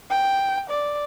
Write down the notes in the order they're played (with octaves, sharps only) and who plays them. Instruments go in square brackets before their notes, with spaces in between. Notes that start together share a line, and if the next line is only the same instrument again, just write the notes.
[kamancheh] G5
D5